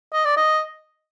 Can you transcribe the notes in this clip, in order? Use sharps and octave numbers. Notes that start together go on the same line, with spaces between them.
D#5
D5
D#5